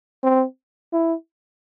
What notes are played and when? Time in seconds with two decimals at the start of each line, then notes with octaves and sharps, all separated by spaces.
0.24 C4
0.93 E4